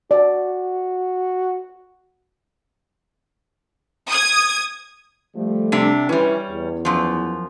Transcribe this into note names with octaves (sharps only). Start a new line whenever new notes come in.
F#4 D5
D#6 G#6
F3 G3 A3
C3 D4 E5
E3 G3 C#4
E2
F#2 F3